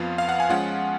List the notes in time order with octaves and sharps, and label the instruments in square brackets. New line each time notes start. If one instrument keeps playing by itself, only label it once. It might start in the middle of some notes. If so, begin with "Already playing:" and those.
Already playing: [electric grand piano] F2 F3 B3 F4 F5
F5
F#5
G#5
F3 G#3 C#4 F4 F#5